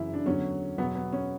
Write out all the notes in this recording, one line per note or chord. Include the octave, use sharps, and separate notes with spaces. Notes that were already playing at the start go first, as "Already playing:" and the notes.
Already playing: F#2 C#3 E3 E4
D4
E2 D3 F#3 C#4
E2 B2 F#3 B3
B3
C#4